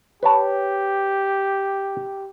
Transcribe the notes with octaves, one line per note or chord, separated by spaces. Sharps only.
G4 B4 C#5 A5